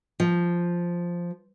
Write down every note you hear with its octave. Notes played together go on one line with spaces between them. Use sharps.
F3